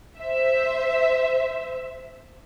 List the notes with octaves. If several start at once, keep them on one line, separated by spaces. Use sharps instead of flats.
C5 E5